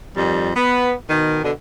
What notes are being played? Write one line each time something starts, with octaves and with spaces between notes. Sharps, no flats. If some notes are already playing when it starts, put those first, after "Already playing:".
F2 D#3 G3
B3
B2 D#3
B2 D3